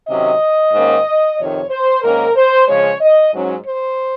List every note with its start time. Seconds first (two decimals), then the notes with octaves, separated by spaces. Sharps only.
0.08 C3 D#3 F#3 C#4 D#5
0.73 G#2 D#3 A#3 C#4
1.38 F2 C3 D#3 C#5
1.70 C5
2.03 G#2 D#3 A#3 C#4 A#4
2.35 C5
2.68 C#3 F3 G#3 C#4 C#5
3.00 D#5
3.32 G#2 F#3 C#4
3.65 C5